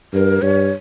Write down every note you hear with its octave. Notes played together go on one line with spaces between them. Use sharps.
G2 A#4
G2 C#5